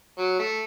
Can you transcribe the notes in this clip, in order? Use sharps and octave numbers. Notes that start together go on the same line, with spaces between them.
F#3
A3